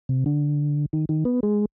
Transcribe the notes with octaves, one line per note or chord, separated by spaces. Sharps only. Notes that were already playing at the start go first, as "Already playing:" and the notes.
C3
D3
D#3
D#3
B3
G#3